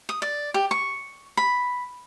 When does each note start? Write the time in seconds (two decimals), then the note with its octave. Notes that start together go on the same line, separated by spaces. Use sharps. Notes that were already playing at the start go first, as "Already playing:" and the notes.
0.09 D#6
0.22 D5
0.54 G4
0.71 C#6
1.37 B5